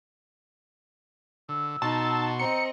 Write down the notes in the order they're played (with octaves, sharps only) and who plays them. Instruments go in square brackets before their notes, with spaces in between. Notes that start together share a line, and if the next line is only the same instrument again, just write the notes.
[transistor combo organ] D3 [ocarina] E6
[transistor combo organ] B2 F#4 C6 [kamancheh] D#4 [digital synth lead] A5
[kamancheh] C4 D#5 [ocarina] A#5 [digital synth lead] C#7